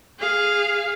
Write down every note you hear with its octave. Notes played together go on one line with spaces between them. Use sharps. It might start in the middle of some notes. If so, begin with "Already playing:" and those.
G#4 F5